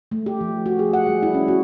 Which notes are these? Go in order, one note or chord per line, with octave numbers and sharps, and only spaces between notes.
A3
G4
F3
F#4
G#4
F#5
G3
E4
C#4
F#4